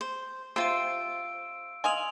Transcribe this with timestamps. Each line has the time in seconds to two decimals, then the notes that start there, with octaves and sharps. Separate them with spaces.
0.01 C5
0.56 C3 F4 C5 E6 D7
1.84 D#5 F5 G#5 C6 F7 F#7